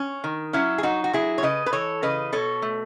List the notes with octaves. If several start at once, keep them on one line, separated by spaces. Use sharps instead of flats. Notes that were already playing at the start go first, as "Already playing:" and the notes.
Already playing: C#4
D#3
F#3 C#4 E4
G#4
F#3 D#4 F#4
F#4
F#3 E4 G#4
C#5
C#3 B4 D#5
B4
E3 A4 C#5
C#3 B4 D#5
B2 A4 C#5
A3